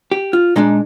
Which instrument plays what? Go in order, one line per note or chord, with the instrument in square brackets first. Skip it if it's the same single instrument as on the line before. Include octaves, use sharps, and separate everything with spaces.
[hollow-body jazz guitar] G4
F4
A#2 G#3 D4 D#4